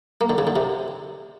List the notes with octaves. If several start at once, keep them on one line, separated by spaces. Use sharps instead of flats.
A#3
D3
C#3
D3
C3